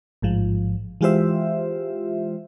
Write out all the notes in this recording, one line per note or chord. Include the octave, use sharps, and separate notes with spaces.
A1 G#2 F3
E3 G#3 F4 G4 C5 E5